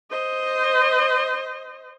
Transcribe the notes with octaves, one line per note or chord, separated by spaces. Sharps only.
C5 D#5